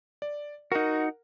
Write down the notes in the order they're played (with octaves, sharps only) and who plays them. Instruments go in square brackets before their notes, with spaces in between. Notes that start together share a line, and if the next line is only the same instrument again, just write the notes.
[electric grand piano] D5
[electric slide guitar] D#4 F#4 [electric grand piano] A#4 F#5